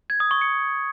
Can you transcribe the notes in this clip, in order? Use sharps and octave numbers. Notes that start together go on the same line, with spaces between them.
G#6
D#6
C#6
C#7